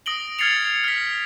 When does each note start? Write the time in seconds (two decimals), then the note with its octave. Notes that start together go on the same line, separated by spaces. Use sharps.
0.06 D#6 A#6 D7 F#7 G7
0.39 F6 G#6 A6 C7 C#7 F7
0.84 F6 B6